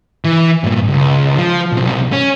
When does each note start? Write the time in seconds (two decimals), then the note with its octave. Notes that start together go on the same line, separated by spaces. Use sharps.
0.25 E3
0.64 G2 A#2
0.88 C#2
1.37 F3
1.72 B1 C3
2.12 C#4